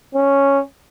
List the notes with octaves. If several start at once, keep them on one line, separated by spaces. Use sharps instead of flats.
C#4